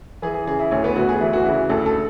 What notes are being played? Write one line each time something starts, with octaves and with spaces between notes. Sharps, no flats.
E3 G#4
G#4
C#3 G#4
E4
D2 C#4
B3
D2 F#4
G#4
E3 E4
F#4
C#3 E4
D2 A4
A4